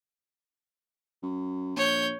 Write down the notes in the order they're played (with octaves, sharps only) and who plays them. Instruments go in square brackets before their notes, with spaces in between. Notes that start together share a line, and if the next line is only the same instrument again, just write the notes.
[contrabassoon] F#2
[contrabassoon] A#1 [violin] C#5 G6